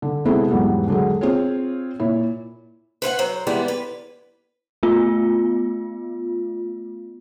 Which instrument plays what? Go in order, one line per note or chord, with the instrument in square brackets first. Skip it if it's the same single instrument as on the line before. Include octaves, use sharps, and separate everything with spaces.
[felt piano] D3
C3 G#3 B3 C4 E4 A4
E2 G#2 F#3 G3 B3
D3 F#3 G#3
C4 F4 G#4 C#5
A#2 E4 C#5
[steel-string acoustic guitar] B4 C5 F5 F#5
F#3 C5
E3 G3 G#3 B3
B4
[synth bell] A3 B3 F4